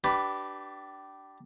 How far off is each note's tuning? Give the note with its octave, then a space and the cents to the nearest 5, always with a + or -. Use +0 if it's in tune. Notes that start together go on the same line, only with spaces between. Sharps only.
D4 +0 G4 -30 B4 +0